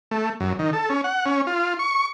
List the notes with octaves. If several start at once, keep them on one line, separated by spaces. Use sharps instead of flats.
A3
F#2
D#3
A4
C#4
F#5
C#4
F4
C#6